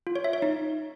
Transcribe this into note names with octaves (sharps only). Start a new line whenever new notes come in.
F4
C#5
E5
C#5
D#4